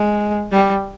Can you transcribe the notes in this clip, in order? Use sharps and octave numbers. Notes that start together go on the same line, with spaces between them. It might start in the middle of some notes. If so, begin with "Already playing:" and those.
Already playing: G#3
G3